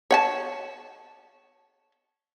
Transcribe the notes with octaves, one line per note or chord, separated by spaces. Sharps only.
C#5 F#5 A5